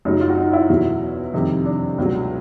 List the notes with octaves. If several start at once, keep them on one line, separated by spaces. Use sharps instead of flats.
F#2 C#3 F#3 D#4
F4
F#4
D#4
E4
E2 B2 F#3
F2 C3 D#3 G3 D#4
D4
C#2 B2 F#3